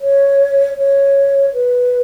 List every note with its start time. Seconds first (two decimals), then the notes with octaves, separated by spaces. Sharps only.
0.01 C#5
0.77 C#5
1.54 B4